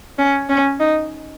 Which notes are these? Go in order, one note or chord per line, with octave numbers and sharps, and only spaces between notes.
C#4
C#4
D#4